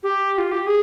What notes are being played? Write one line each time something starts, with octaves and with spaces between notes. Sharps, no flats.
G4
F4
G4
G#4